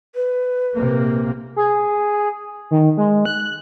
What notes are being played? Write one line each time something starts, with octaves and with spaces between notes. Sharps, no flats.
B4
A#1 C3 A#3
G#4
D#3
G#3
F#6